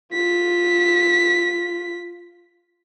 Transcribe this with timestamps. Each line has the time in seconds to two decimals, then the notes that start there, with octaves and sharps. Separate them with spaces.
0.13 F4 B6